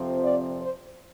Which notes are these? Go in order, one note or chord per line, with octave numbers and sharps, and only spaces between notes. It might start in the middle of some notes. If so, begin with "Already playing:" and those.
Already playing: F2 C3 F3 C4
D5
C5